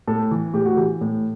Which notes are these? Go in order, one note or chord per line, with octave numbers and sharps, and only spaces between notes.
A2 A4
E3
A2 G4
F#4
E3 G4
A2